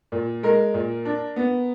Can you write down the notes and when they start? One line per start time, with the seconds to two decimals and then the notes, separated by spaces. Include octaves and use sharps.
0.12 A#2
0.43 G#3 A#4
0.74 A#2
1.05 D4
1.36 B3